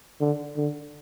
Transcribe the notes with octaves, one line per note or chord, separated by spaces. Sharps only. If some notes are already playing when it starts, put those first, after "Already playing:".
D3
D3